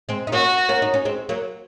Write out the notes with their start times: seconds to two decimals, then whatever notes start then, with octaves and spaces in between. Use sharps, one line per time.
0.09 G#3 C4
0.27 D#4
0.32 A#3 C#4 F#4
0.69 A#3 C#4
0.82 D#4
0.94 C#4
1.05 G#3 C4
1.29 F#3 A#3